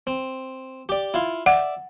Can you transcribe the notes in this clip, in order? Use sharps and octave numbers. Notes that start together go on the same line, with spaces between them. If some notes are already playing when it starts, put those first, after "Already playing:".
C4
G4 D5
E4 F4 F5
D5 E5 F#5